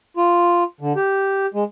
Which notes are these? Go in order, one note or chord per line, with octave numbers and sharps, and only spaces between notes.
F4
D3
G4
G#3